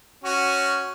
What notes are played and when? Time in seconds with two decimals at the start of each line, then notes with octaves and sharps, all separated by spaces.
0.24 C#4 F#4